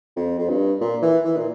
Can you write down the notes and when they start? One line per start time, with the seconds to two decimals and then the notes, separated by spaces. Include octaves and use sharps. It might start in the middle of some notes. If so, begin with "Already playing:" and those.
0.16 F2
0.38 F2
0.49 G2
0.81 A#2
1.02 E3
1.24 E3
1.37 A#2